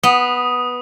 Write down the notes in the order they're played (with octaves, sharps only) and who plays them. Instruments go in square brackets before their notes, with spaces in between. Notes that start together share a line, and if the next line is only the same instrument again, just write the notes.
[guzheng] B3 [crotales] D#6